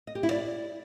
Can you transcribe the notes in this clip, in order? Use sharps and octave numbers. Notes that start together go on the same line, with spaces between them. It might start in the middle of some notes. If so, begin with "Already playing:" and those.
D#5
G4
E4
D5